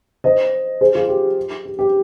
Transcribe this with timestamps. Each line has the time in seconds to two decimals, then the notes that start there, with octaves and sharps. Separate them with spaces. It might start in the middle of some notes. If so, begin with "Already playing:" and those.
0.24 C5 D#5
0.81 G#4 C5
0.95 F4 G#4
1.09 G4
1.65 G4
1.79 G4